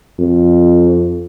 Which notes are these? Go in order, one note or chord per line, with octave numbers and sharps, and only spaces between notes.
F2